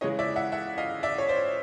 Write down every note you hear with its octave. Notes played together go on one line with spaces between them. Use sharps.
C#3 E3 G#3 C#5 D#5
D5 E5
E5 F#5
E5 F#5
D#5 F5
D5 E5
C#5
C5 D5